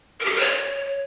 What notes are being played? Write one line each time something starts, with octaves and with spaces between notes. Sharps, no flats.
A#4
G4
A4
A#4
C#5